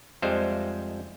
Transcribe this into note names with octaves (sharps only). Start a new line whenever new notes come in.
F2 G3 G#3 C5 E5